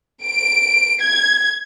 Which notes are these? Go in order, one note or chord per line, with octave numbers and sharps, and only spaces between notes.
D7
G#6